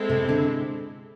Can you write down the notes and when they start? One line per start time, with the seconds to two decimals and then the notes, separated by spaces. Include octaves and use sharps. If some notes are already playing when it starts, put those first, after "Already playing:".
Already playing: G#3 C4 E4 A4
0.09 C3
0.29 D3